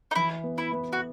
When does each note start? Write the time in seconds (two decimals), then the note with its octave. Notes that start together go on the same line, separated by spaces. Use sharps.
0.11 D#4
0.15 E3 E4
0.43 B3
0.58 E4
0.72 B3
0.93 F#4